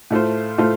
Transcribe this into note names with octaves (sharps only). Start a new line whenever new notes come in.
A2 A3 F4 C5
A2 A3 F4 C5